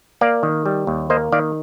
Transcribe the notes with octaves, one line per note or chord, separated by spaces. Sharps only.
A#3 D5 F5
D#3
G3
D#2
A#3 C5 D#5
D#3 D5 F5